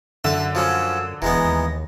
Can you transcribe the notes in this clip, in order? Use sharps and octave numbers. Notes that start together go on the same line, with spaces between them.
F#2 D3 E5 A5
F3 F#3 C#4 E6
E1 E3 G#3 B3 A#5
D#2